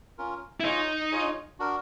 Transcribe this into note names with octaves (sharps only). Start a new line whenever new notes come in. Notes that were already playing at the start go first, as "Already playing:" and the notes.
C#4 F4 A#4
E4
D#4 F4 G#4 C#5
F4 G#4 C#5
D4 F#4 A#4